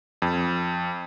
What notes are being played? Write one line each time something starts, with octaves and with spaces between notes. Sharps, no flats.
F2